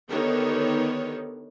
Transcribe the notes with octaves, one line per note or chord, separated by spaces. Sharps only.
D3 D#3 B3 D#4 G4 C#5